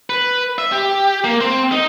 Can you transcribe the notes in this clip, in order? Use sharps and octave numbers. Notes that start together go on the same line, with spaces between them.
B4
E5
G4
A#3
C4
D#4